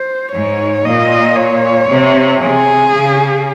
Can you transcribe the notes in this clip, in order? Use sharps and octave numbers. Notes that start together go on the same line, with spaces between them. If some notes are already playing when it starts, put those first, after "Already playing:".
Already playing: C5
G#2 C#5
A#2 D#5
C#5
C3
C3 G#4
C#3